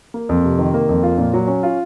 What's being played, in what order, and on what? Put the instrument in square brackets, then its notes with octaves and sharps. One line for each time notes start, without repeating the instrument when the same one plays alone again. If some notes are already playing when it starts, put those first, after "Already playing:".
[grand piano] A#3
F2
C3
D#3
A#3
F2
F4
A#2
F#3
C#4
F4